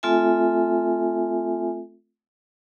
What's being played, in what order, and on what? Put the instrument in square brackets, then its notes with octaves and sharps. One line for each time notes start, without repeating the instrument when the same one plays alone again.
[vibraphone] A3 C4 F4 A4 E5 G#5